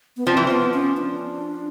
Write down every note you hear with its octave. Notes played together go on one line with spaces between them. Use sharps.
B3
F3 C4
E3
F3 B3
C#4
D4